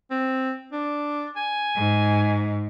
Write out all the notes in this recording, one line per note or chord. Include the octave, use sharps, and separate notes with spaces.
C4
D4
G#5
G#2